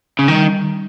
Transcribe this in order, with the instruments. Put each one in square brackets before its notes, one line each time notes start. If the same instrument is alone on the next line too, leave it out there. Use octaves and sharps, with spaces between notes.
[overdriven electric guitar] C#3
[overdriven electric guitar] D#3 [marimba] G3